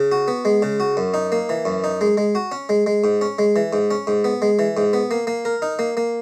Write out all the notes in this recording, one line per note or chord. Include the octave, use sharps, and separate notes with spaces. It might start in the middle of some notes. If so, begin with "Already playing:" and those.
Already playing: C#3
F#4
B3
G#3
C#3
F#4
F#2
D#4
A#3
E3
F#2
D#4
G#3
G#3
F#4
C#4
G#3
G#3
G#2
C#4
G#3
E3
G#2
C#4
G#2
B3
G#3
E3
G#2
B3
A#3
A#3
A#4
D#4
A#3
A#3